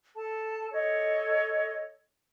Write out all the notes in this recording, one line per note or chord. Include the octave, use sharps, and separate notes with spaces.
A4 A5
A4 C#5 D#5